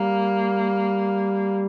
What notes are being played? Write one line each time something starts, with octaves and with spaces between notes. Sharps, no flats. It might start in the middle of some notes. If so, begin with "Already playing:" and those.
Already playing: G3 A#3